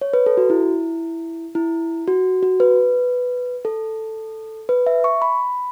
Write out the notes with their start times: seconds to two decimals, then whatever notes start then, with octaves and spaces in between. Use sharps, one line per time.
0.01 C#5
0.13 B4
0.26 A4
0.37 F#4
0.50 E4
1.55 E4
2.08 F#4
2.43 F#4
2.60 B4
3.65 A4
4.69 B4
4.87 E5
5.04 C#6
5.22 B5